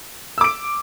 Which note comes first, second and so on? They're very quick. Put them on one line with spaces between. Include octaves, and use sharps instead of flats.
E6 D6 D7